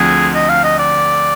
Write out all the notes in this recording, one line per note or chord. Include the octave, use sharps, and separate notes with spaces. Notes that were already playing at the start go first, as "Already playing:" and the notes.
Already playing: D2 D3 F3 C4 G#4
D#5
F5
D#5
D5